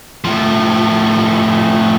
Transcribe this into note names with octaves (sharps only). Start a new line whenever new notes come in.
A2 F3